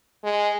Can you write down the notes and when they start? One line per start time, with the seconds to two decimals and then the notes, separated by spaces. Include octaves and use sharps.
0.23 G#3